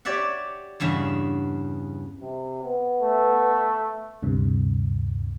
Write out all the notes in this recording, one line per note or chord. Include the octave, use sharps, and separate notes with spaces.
G4 C#5 D5 E5 F#5
E2 G2 C#3 E5
C3
B3
A3
D2 G2 C3